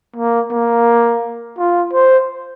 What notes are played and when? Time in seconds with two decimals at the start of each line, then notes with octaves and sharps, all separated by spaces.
0.16 A#3
0.51 A#3
1.58 F4
1.93 C5